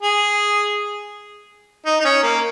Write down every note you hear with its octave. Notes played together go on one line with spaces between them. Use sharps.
G#4
D#4
D#4
C#4
A#3